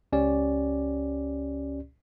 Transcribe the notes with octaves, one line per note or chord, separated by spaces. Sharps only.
C#2 C#4 G4 D5